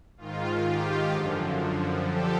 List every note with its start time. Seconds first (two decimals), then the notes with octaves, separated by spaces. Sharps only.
0.17 G#2 D#3 F4
0.65 F4 G4
1.12 F#2 D3 F3
2.07 D3 F3 G4 A4